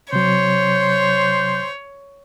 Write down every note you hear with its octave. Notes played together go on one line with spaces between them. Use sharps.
C3 F#3 C5 C#5